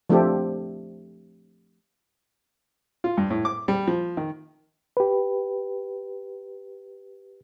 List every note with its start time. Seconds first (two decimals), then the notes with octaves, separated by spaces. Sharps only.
0.10 F3 A3 C4 D4 G4 A4
3.04 F4
3.18 G2
3.30 A2
3.45 D6
3.68 G3
3.88 F3
4.17 D#3
4.97 G4 B4